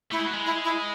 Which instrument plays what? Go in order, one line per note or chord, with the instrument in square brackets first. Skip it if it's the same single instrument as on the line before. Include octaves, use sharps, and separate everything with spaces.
[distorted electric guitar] A3 [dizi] E4
[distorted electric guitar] G#3
F#3
G#3
[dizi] E4
E4